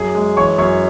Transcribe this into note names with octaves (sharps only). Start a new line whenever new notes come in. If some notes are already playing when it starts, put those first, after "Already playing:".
Already playing: F#2 G#4 G#5
G#3
E3 C#5 C#6
F#2 C#5 C#6